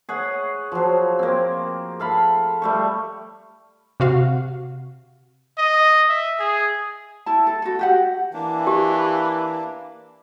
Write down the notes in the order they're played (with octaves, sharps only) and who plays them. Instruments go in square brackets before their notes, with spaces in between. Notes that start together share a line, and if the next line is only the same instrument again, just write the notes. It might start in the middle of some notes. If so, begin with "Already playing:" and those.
[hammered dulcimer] G#4 C#5 F#5
F3 F#3
A#3 C4
A4 F5 B5
G3 A3 C#6
[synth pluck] C3 F#4 F5
[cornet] D#5
E5
G#4
[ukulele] E4 A4 A5
A4
F#4 A4
F#4 G4 F#5
[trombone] E3 [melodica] A#3 D4
[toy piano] G4